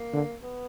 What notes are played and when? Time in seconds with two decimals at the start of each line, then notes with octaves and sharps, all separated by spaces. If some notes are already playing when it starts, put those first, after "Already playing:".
Already playing: A#3
0.13 D3
0.43 B3